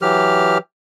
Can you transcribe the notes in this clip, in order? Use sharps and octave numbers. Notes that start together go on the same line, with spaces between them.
E3 F#3 G4 F6